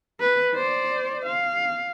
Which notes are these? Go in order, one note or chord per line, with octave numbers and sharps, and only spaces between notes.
B4
C5 D5
F5